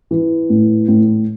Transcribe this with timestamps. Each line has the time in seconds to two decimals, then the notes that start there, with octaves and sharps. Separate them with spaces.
0.11 E3
0.50 A2
0.88 A2